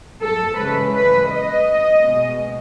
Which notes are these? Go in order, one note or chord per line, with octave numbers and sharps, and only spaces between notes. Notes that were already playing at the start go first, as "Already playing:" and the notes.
A4
C#3 E3 G#3 B4
B4
D#5
B2 G#3